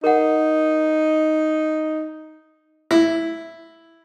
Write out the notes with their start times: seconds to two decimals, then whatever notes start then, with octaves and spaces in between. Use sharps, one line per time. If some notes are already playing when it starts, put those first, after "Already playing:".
0.04 D#4 A#4 F#5
2.91 E4